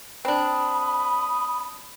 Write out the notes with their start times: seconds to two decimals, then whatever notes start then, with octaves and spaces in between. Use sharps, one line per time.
0.25 C4 D4 B5 D#6